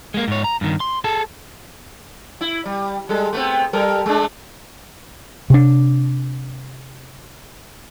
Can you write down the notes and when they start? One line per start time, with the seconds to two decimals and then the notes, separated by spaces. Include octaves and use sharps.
0.14 G#3 A#3
0.28 G#2 C#5
0.44 A#5
0.61 G2 D#3
0.80 C6
1.04 G#4 A4 A5
2.41 E4
2.65 G3
3.09 G3 G#3 A4
3.33 A3 B3 C4
3.73 G3 A4 A#4
4.06 G#3 A3 D4
5.50 C3 D4